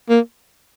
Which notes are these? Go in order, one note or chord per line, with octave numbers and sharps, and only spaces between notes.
A#3